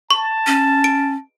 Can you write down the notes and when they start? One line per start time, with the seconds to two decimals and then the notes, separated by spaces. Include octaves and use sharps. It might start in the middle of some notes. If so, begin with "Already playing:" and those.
0.11 A5 C#6
0.46 C#4
0.84 D7